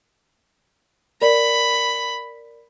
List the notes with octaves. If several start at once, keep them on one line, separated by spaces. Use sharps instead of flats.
A#4 D5 B5